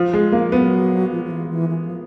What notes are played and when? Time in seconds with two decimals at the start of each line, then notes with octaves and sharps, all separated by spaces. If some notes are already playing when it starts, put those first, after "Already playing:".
Already playing: F3
0.14 G#3
0.32 F3 A#3
0.52 F#3 B3
1.12 F3
1.25 F3
1.31 E3
1.50 E3
1.69 E3
1.85 F3